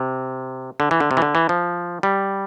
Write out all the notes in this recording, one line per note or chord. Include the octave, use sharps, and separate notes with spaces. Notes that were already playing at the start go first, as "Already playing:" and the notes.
Already playing: C3
D3
E3
D3
C3
E3
D3
E3
F3
G3